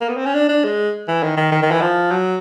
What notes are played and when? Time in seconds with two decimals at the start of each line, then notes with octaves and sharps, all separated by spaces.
0.01 A#3
0.09 B3
0.17 C4
0.26 C#4
0.35 D4
0.49 D4
0.64 G#3
1.08 E3
1.23 D#3
1.37 D#3
1.52 D#3
1.62 D#3
1.71 E3
1.81 F3
2.11 F#3